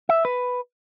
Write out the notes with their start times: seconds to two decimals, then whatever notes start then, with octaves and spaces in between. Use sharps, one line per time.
0.09 E5
0.25 B4